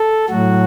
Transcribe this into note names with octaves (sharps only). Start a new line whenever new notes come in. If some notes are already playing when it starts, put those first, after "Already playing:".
Already playing: A4
A2 F#3 F#4